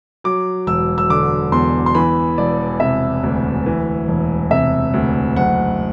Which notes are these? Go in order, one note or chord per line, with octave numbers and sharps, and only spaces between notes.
F#3 D6
E1 E6
E6
D3 D6
E2 C6
C6
E3 B5
E1 D5
C3 E5
D2
E3
E1
C3 E5
D2
F#1 F#5